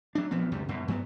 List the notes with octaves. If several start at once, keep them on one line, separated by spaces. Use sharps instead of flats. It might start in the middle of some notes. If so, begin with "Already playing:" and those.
F#3 D4
A#1 F3 B3 C4
C#2 F#2 C3 G3
C2 F#2 B2
G2 F#3 A#3 B3